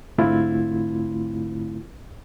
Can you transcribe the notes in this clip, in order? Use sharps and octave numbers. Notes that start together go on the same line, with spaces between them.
G#2 D3 A3 C4 E4 F4